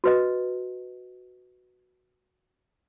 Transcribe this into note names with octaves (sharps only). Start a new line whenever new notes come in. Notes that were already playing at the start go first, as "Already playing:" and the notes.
F#4 B4 D#5